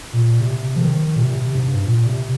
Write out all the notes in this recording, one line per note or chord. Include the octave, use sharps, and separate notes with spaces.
A#2
C3
F3
D#3
A#2
C3
C3
G#2
G2
A#2
C3